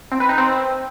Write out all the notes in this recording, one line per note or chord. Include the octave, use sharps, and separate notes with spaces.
C4
B4
D#4
C4